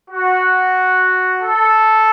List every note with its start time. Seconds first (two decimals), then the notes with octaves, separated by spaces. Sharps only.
0.10 F#4
1.40 A4